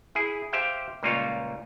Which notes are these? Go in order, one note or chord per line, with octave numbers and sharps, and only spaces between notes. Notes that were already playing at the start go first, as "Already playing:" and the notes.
E4 G#4
G4 C5 E5 F5 G5
C#2 A#2 G3 A#3 F4 C#5